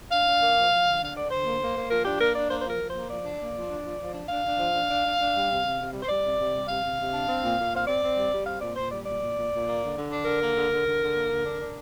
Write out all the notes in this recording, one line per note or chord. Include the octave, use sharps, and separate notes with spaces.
D4 F5
D4
A#3
F3
F3
D3
D4 F5
D3 D5
D3 C5
A#3
A#3
A#3
F3 A#4
D4 G4
A#3 A#4
D4 D5
A#3 C5
C5
F3 A#4
F3
A#3 C5
F3 D5
D4
A#3
F3
D4
F3
F3
D4
D4 F5
D4
F3
D4
D4
D4
D4
G3
C3
C3
C3
G3
C5
G3 D5
C3
C3
G3
C3 F5
C3
C3
D4
C4
A#2
A#2
C4 F5
C4 D5
C4
G3
G3
C4 F5
A#2 D5
A#2 C5
G3 D5
A#2 D5
A#2
A#2
A#2
A#3
D3
D3
D4
D3 A#4
A#3
D3
D3
D3
D3
A#3
D3
D4
D4